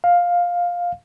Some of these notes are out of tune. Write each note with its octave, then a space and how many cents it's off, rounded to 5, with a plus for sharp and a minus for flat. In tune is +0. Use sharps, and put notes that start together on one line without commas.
F5 +10